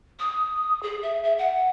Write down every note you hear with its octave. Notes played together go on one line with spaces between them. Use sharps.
D#6
G#4
E5
E5
F#5